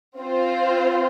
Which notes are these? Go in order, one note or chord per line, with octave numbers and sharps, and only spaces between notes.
C4 F4 C5